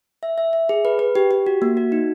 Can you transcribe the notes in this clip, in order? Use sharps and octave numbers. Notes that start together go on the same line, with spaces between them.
E5
E5
E5
G#4
B4
B4
G4
G4
F#4
A#3
F#4
D#4